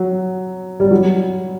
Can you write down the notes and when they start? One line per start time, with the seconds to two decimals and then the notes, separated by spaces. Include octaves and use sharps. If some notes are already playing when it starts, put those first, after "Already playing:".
Already playing: F#3
0.80 G3
0.91 F#3